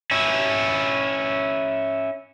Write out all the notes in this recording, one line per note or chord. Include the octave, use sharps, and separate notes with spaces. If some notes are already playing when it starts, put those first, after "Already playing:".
C#4 E4